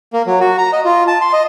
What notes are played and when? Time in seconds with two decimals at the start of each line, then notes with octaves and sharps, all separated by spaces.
0.13 A#3
0.27 F#3
0.41 F#4
0.58 A#5
0.73 D#5
0.85 F4
1.08 A5
1.21 C6
1.33 D#5